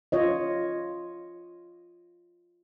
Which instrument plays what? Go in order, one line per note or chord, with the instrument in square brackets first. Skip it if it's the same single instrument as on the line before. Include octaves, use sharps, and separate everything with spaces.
[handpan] F4 C#5 D#5